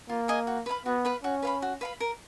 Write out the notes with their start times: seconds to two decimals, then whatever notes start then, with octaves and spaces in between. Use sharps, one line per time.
0.09 A#3 F4
0.28 G#4 D#5 G#5
0.47 F#4
0.66 B4 F5 B5
0.86 B3 F#4
1.05 B4 F5 B5
1.24 C#4 F#4
1.43 B4 F5 B5
1.62 F#4
1.81 B4 F5 B5
2.00 A#4